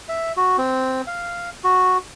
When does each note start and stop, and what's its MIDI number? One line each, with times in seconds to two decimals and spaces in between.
0.09 0.32 76
0.37 0.57 66
0.58 1.02 60
1.07 1.50 77
1.64 1.97 66